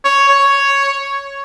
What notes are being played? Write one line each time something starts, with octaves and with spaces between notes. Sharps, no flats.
C#5
C#5